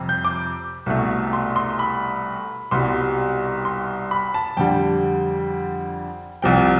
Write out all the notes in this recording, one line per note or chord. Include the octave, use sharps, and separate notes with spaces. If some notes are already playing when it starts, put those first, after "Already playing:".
Already playing: F2 C3 G3
G6
D6
C2 B2 A3
C6
C6
B5
C2 B2 G3 C6
C6
B5
A5
F2 D3 G3 G5
C2 C3 F3 G5